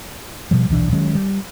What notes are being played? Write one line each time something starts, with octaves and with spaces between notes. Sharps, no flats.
B2 F3 G3
D#1 B1 E3 D4
D#3 F#3 G#3 C#4
G3